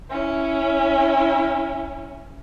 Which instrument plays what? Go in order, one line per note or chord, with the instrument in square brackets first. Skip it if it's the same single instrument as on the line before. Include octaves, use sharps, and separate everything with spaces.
[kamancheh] C#4 E4